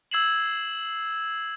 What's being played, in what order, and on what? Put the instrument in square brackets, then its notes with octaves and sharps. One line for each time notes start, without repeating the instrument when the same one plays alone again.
[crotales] E6 G#6 C7 E7 F#7